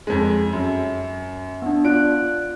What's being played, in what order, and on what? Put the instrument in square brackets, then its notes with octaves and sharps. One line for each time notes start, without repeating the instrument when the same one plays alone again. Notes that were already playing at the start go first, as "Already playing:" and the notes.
[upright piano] F2 G#3
F#2
[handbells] B3 D4
[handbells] F4 D5 F#6 [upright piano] D7